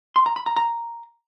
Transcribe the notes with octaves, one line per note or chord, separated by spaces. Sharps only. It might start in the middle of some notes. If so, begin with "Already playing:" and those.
C6
A#5
B5
A#5
A#5